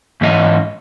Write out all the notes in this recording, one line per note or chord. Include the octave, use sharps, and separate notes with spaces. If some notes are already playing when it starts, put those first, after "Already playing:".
G#2 E3 C#4 G#4 D#5